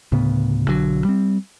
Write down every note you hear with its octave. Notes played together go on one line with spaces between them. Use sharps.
D2 A2 C#3 B3
B1 D3 F#3
G3 C4